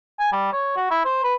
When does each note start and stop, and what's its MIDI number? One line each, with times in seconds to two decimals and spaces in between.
0.19 0.32 80
0.32 0.52 55
0.53 0.76 73
0.76 0.88 66
0.91 1.00 64
1.05 1.23 72
1.24 1.35 71